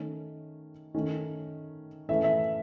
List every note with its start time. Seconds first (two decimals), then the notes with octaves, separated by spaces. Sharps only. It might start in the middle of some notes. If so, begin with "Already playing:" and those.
Already playing: D#3 A3 C#4
0.94 D#3 A3 C#4
2.09 A2 E3 A3 C#4 E5
2.24 E5